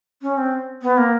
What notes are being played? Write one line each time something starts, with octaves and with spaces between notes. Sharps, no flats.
C#4
C4
B3
A#3